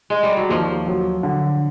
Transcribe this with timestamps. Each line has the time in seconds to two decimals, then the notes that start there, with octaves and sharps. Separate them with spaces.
0.10 G#3
0.23 G3
0.37 F#3
0.49 D#2 F3
0.87 F#3
1.23 D3